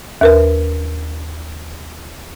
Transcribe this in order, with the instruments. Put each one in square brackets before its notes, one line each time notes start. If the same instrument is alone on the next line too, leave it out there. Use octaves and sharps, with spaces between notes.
[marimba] D#2 A#4 B4